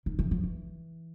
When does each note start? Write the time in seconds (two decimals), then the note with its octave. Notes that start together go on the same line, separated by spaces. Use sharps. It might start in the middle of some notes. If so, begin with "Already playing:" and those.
0.06 D#3
0.19 E3
0.31 F3
0.43 E3